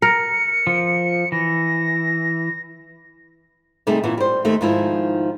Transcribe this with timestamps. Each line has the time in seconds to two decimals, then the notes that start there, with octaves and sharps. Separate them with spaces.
0.02 A#4 C#7
0.67 F3
1.32 E3 A#6
3.87 C3 G3 A3 D#4 G4 G#4
4.03 A#2 E3 B3 C#4
4.17 G3 C5
4.45 D#2 D#3 A3 D#4
4.61 G#2 D#3 F3 D#4 E4